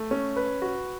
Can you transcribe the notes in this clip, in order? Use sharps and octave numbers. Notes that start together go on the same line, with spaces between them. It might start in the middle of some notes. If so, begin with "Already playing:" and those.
Already playing: A3
C#4
B4
F#4